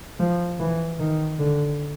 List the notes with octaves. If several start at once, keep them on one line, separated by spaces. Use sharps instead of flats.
F3
E3
D#3
D3